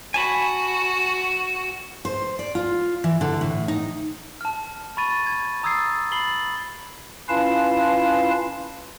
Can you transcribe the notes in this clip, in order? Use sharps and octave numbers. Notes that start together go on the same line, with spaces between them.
F#4 G#5 A5 B5
C5
D5
F4
E3
D3
A2
D#4
A5 F6
B5 C#6 A6 D#7
G#6
A#5 D#6 E6 G#6 A6 C7
B5 A6 C7 F#7 G7
C#4 E4 F4 B4 F5 A5